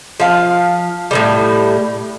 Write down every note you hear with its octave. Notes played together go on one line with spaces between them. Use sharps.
F3 F5
A2 D#3 G3